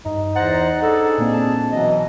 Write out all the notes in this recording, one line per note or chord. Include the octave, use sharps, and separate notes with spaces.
G2 D#4
E2 C5 F#5 A#5 A6 A#6
D4 G#4 A4
A#2 A#3 C4
A5
B2 E3 F#3 D#5